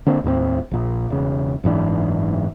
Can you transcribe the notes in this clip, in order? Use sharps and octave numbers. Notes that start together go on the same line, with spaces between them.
D3 A#3 C4 D4
D#2 A2 A#3 C4
A#1 A#2
E1 C#3
F#1 G#2 E3 D4